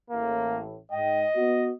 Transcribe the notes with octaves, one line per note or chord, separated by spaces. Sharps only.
A1 A2 A#3
G#2 D#5 G5
B3 F#4